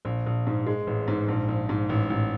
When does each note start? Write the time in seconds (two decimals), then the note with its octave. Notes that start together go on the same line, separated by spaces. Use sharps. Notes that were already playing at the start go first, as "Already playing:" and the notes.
0.05 A#1
0.26 A#1
0.47 G#2
0.67 G#3
0.87 A1
1.08 G#2
1.28 A#1
1.48 A#1
1.69 G#2
1.89 A1
2.10 A1